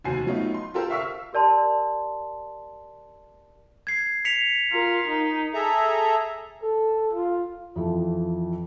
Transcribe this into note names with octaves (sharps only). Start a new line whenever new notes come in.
F1 D#2 F#4 C5 G#5 C7
F#3 A3 B3 D#4 F4
C6
F4 G4 A4 A#4 C5
E5 F5 C#6 E6 F6 B6
G4 A#4 D5 A5 C6
G#6 C7
B6 C#7 F7
F4 A#4
D#4
G#4 A4 E5 A#5
A4
F4
F2 E3 F3